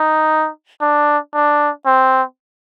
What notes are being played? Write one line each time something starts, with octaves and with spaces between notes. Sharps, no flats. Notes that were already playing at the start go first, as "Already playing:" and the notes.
Already playing: D#4
D4
D4
C4